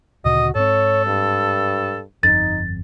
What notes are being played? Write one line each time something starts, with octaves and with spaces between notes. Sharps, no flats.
D2 A#2 C#3 F#4 D#5
G#2 C4 A4 C#5
G2
G1 F2 D#4 A6